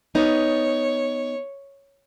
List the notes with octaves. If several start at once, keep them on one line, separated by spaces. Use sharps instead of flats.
B3 D#4 C#5